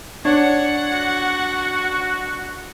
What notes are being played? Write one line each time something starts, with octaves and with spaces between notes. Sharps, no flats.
D4 C#5 F#5
F#4